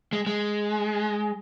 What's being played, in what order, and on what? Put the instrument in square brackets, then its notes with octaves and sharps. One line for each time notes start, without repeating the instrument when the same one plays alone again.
[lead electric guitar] G#3
G#3